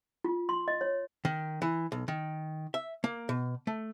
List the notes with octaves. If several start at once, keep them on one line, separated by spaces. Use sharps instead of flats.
F4
C6
D#5
C#5
D#3
E3
B1
D#3
E5
A#3
B2
A3